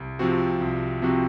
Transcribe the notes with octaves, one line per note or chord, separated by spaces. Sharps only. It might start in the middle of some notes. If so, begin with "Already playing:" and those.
Already playing: C2
C3 F3 C4 F#4
C2
C3 F3 C4 F#4